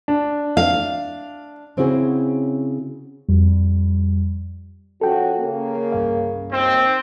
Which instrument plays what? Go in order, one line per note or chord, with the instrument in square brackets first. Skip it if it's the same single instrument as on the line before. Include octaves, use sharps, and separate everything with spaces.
[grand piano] D4
[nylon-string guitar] F5
C#3 C4 C#4 E4 F#4 G#4
[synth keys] F2 G3
[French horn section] F3 C#4 F#4 [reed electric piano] A4 G5
[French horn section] C#3 A#3
[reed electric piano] C2 G2 F5
[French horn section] D#2 [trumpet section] C4